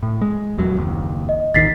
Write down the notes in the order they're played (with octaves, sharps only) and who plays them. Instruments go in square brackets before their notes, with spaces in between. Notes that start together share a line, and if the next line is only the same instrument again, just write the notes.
[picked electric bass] A2
G#3
D#1 E2 F#3
F#1 D#2
[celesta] D#5
[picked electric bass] A1 D#2 D#3 [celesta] A6 B6 C7